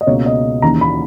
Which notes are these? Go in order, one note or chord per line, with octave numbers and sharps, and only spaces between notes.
D#5
C#2 B2 A#3 C#5
D#5
D#2 C#3 E3 A#5
B5